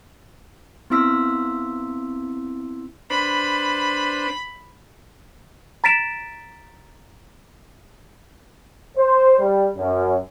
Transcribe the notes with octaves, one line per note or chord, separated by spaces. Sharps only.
B3 C4 E4 C6 E6 B6
D4 B4 C5 B5
A#5 A6 B6 D7 E7
C5
G3
F#2